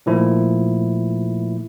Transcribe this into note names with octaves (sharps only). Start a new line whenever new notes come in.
A#2 D#3 F3 A3 E4